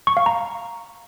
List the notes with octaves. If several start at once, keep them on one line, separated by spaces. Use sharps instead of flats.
C#6
F5
A#5